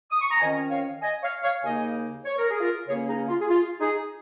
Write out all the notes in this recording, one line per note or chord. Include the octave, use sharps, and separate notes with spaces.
D#6
C#6
A#5
F2 D#3 C#4 D#5 G#5
C#5 F5
D#5 G#5
C#5 F5
C#5 F5
D#2 C#3 A#3 D#4 D#5 G#5
C#5
A#4
G#4
F4 A#4
C#2 C#3 A#3 C#4 G#4 C#5
D#4 G#4
F4
G#4
F4
D#4 G#4